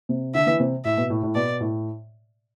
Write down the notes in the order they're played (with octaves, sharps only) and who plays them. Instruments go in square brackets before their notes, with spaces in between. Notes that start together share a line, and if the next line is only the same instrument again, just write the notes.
[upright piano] C3
[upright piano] D3 [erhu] E5
[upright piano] E3
C3
[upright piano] A2 [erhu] E5
[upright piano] B2
A2
A2
[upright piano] B2 [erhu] D5
[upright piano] A2